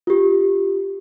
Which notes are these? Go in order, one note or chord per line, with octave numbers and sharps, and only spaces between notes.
F4 G4